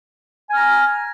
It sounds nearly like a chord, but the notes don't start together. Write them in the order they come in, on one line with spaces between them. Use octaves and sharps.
G#5 F6 A#5